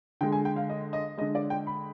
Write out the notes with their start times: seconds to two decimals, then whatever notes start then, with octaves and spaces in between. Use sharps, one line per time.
0.21 D3 G#3 G5
0.32 G#5
0.45 G5
0.56 F5
0.69 D#5
0.93 D#5
1.17 G#3 D#5
1.21 D3
1.35 D5
1.50 G5
1.67 B5